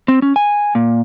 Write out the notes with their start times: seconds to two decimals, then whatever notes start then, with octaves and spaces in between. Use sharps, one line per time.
0.08 C4
0.22 C#4
0.36 G#5
0.75 A#2